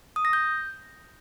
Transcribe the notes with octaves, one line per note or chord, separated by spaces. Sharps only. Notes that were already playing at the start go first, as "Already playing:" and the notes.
D#6
A#6
G6